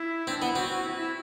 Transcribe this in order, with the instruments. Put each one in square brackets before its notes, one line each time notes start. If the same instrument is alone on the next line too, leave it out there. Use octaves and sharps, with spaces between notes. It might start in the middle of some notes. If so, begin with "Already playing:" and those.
Already playing: [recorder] E4
[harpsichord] C4 [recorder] D4
[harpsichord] B3 [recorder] E4
[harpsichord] C4 [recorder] F#4
[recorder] F#4
E4
E4